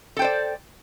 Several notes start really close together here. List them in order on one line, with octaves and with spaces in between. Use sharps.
A4 G5 C5 D5